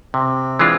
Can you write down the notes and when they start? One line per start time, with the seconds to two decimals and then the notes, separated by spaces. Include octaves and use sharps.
0.14 C3 C4
0.59 E3 G#3 D4 F4